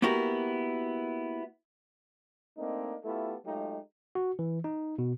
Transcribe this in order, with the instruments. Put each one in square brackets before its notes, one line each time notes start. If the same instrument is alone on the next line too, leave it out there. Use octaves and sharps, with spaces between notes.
[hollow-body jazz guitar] A#3 B3 E4 F#4 G4 A#4
[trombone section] A3 A#3 C4 D4 D#4
A3 B3 E4 F4 G4 A4
F#3 G#3 A3 D#4 F4 G4
[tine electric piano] F#4
E3
D#4
B2